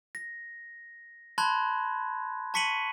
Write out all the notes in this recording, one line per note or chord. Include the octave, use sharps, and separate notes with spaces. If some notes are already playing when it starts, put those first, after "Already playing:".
A#6
A5 B5 C6 F#6 G#6
A5 C#6 B6 C#7 D#7 F#7